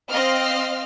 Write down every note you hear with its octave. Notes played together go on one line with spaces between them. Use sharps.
C4 D#5 F5 F6